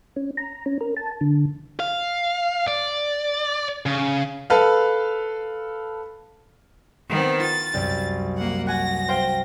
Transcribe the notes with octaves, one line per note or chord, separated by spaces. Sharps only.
C#4
A#5
C#4
A#4
A5
D3
F5
D5
C#3
A4 B4 F5
D#3 B3 C4
F4 A6
C2 F#2
A#3 F#5
F#5 G#5 A#6
C5 F5 G5